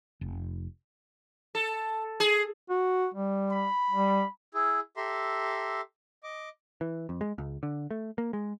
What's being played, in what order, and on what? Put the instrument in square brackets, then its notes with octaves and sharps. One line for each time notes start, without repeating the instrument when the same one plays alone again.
[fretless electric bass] F1
[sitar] A4
G#4
[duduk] F#4
G3
[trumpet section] B5
[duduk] G3
[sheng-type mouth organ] E4 G#4
G4 A4 E5 A#5 C6
D#5 D6
[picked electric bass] E3
F2
G#3
C#2
D3
A3
A#3
G#3